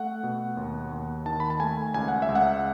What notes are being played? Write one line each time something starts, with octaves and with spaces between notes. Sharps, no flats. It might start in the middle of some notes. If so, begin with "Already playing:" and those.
Already playing: A3 F#5
B2
D#2
D#2
D#3 A5
B5
A5
A3 G#5
C#2 G#5
F#5
E5
C#2
F#5